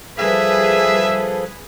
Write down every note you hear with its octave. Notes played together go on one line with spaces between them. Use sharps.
F3 G3 G#4 A4 B4 E5